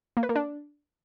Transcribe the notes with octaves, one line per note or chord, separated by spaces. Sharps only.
A#3
B4
A#3
D4